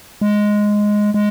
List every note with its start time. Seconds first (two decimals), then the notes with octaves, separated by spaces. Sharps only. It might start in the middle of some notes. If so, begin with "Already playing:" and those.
0.21 G#3
1.14 G#3